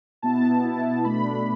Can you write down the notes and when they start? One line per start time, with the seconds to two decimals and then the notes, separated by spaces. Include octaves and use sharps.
0.22 B2 B3 E4 A5
0.64 B2 B3 E4
1.04 B2 A3 D4 B5